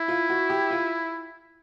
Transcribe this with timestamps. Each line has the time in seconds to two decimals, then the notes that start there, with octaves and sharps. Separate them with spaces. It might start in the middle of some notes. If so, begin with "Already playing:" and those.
Already playing: E4
0.08 F4
0.30 F#4
0.50 G4
0.71 F4